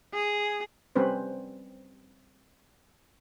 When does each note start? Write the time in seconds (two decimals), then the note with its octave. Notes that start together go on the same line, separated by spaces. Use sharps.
0.14 G#4
0.96 G3 C4 C#4 B4 C5